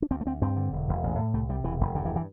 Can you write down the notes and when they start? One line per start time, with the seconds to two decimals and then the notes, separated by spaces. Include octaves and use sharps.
0.02 D4
0.11 D2 C4
0.21 A3
0.26 D2 C4
0.41 G2 C4
0.56 D3
0.73 E1
0.88 E1
1.04 A1
1.18 A2
1.34 C2 A3
1.49 C3 G3
1.64 E1 E3
1.81 E1
1.95 G2 D3
2.05 E3
2.16 E3